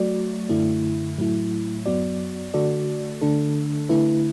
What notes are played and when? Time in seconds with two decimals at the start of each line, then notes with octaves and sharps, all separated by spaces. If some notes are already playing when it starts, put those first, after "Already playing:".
Already playing: F#3 A3 F#4 D5
0.49 F#2 D3 A3 E4
1.18 A2 F#3 A3 E4
1.86 F#2 F#3 B3 F#4 D5
2.54 D3 A3 F#4 A4 D5
3.21 D3 A3 D4 A4
3.89 D3 A3 E4 B4